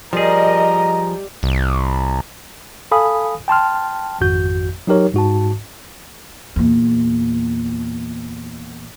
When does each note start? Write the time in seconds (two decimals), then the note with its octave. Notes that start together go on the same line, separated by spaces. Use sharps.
0.13 F3 G3 G#4 A#4 D#5 A#5
1.43 C2
2.92 A4 F5 G#5 B5 D#6
3.48 G5 A5 C6 F6
4.21 G#1 F2 F#4 G6
4.87 F#3 D#4 G4 A#4 C#5
5.14 G#2 F#4 A5
6.56 E2 A#2